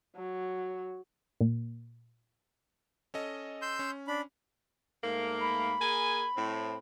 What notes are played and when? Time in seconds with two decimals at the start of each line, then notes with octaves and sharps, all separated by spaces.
0.16 F#3
1.41 A#2
3.14 C#4 A4 D#5
3.62 C6 E6 G6
3.79 C#4
4.08 D4 B5
5.04 G#2 A3 A#3
5.41 B5
5.81 A#3 G#4 G#5
6.36 A2 C4